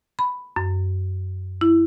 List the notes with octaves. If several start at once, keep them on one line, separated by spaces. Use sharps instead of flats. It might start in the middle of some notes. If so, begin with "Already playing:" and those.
B5
F#2
E4